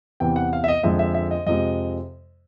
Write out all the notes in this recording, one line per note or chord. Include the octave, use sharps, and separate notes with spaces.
E2 C3 E3 G5
F#5
F5
E5
D#5
F2 D3 F3 G#3 E5
E5
E5
D#5
F2 C3 F3 G#3 D#5